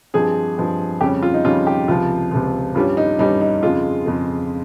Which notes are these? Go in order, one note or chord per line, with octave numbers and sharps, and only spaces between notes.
G2 F3 G#3 C4 G#4
G2 F3 G#3 C4
F2 C#3 G3 C#4 G4
F4
D#4
F2 C#3 G3 C#4 F4
G4
C#2 C3 F3 F4
C#2 C3 F3
G2 G3 C#4 F4
D#4
G2 G3 C#4 D#4
D#4
F2 C#3 G#3 F4
F2 C#3 G#3